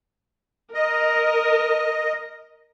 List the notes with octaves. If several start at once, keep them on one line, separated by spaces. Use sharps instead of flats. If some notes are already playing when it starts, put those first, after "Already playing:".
A#4 D#5